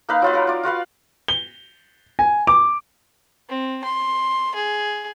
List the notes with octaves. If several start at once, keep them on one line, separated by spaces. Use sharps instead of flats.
A#3 D#4 B4 F5
F#3 F4 B4
A#4 F#5
F4 D5
F4 F#4 B4 F5
G7
G#5
D6
C4
C6
G#4